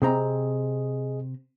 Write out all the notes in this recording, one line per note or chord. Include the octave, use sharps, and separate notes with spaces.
C3 C4 G#4 D#5 A#5